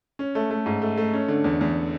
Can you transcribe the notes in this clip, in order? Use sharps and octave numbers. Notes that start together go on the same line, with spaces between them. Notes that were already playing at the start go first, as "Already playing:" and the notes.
C#4
A3
A3
G#2
A3
A3
C#4
D3
E2
E2